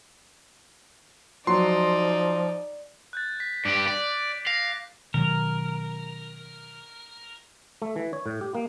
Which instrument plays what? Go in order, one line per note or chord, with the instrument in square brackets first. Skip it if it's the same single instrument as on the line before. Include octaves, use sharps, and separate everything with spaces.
[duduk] F3 [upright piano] F#3 [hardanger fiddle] D#4 D5 [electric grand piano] C6
[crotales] F#6 G6 A6
B6
[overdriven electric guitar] G2 G4 [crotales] D6 D7
[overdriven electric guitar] D5
[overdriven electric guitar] F5 [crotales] A#6
[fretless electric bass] B2 D#3 F#3 [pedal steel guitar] A#4
[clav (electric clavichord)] A3
E3
C#5
A2
G4
A#3